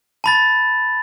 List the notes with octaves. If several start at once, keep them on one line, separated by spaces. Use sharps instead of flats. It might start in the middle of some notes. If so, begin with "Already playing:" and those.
A5 B5 A6